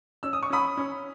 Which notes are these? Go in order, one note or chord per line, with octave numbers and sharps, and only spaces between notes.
C#4 E6
D#6
C#6
C#4 B5 D#6
C#4